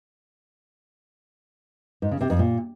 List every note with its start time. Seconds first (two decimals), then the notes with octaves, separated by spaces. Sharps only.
2.02 G#2
2.11 C#3
2.21 C3
2.30 F2
2.39 A#2